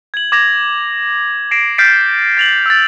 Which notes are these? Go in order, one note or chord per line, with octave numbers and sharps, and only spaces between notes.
G#6 F#7
D6 G#6 A#6 F7
A#6 C7 D7 E7
F6 G6 A6 B6 C7 D7
A6 F7 F#7
E6 A6